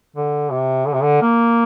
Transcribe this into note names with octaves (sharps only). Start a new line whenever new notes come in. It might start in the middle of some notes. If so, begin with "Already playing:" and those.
D3
C3
D3
C3
D3
A#3